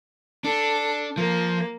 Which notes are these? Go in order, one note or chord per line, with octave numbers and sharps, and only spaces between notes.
D4 A4
F3 A#3